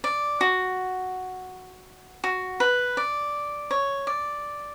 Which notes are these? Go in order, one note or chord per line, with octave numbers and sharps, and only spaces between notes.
D5
F#4
F#4
B4
D5
C#5
D5